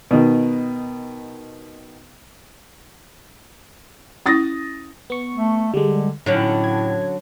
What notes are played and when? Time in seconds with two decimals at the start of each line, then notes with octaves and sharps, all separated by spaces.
0.11 B2 D#3
4.26 C#4 E4 D#6 A6 A#6
5.10 B3 C#6
5.33 A3
5.74 D3 G3 G#3
6.26 A2 D3 F#3 C#4 D#4
6.64 G#6